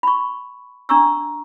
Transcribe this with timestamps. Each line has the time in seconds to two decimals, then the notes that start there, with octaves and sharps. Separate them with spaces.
0.03 B5 C#6
0.89 D4 A#5 C#6 E6